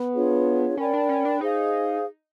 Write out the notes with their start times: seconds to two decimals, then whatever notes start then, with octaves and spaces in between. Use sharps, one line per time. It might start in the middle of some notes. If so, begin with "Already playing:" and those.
Already playing: B3
0.15 D4 F4 G#4 C#5
0.77 C#4 A#4 D5 G5 B5
0.93 D4
1.09 C#4
1.25 D4
1.40 D#4 G#4 C5 F5